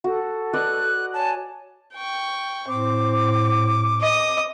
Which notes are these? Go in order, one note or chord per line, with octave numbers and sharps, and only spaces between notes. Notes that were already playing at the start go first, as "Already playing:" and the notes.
F#4 A4
B4 D5 D#5 F#6
C#5 G#5 A5
G5 C#6
A2 C4 D6
D#5 D#6